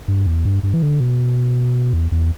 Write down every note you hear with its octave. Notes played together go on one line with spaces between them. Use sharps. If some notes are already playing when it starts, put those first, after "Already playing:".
G2
E2
G2
G2
E3
D3
B2
E2
E2